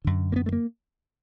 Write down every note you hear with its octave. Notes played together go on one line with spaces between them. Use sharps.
F#2 D3
A#3
B3
A3
A#3